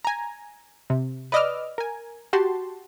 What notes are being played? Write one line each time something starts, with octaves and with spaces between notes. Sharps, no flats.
G#5 A#5
C3
B4 D5 D#5 D6 E6 F6
A#4 G#5
F#4 G4 A5 C6